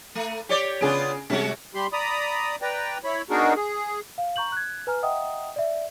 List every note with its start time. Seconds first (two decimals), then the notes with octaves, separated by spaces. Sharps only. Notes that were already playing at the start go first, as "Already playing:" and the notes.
0.15 A3
0.49 G4 C#5 D5
0.81 C#3 B3 D4 F4 G#4 D7
1.30 C3 G3 G#3 C#4 F#4
1.74 G3 G4 B5 C6
1.93 D5 A#5 B5 D#6
2.62 B4 D5 G5 A#5
3.04 E4 C#5 B5
3.30 B3 D4 D#4 F#4 G#4 A#4
3.56 G#4
4.18 F5
4.36 A#5 C#6 G6 F#7
4.52 F#6 G#6
4.87 B4 G#5 A#5 F6
5.03 D#5 E5 F#5 G5 A#5 D#6
5.56 D5 E5